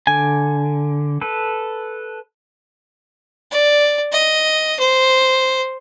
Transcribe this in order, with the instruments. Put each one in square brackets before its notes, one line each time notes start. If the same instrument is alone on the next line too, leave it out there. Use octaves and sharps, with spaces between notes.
[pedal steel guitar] D3 [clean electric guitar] G#5
[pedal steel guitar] A4 B4
[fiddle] D5
D#5
C5